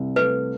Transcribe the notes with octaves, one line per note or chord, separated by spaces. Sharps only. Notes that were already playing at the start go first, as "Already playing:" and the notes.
Already playing: C2
A3 B4